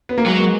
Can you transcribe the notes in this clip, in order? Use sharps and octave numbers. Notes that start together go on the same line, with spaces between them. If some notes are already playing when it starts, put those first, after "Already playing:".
B3
A#3
F#3 G#3